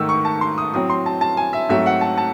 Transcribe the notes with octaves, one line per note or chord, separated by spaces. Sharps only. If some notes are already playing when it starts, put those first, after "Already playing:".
Already playing: G#2 D#3 A3 E6
C#6
A5
C6
D#6
A2 F#3 C4 D#6
C6
A5
A5
G#5
E5
G#2 F#3 A3 C4 E5
F#5
A5
A5